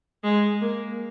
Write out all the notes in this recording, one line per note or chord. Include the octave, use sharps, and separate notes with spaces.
G#3
A#3